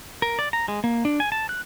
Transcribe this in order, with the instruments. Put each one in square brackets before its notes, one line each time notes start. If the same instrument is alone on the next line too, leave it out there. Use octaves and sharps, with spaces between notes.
[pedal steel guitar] A#4
D5
A#5
G#3
A#3
D4
G#5
A5
F#6